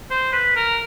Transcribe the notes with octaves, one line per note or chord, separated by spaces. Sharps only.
C5
B4
A#4